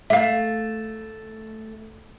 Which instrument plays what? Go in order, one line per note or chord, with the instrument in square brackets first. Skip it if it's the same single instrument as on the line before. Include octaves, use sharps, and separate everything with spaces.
[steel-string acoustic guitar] A3 [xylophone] E5 F5